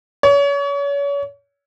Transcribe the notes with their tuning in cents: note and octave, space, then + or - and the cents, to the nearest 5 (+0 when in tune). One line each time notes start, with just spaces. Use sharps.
C#5 +35